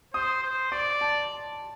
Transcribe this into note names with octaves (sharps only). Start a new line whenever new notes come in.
C5 D#6
C5
D5 C6
A5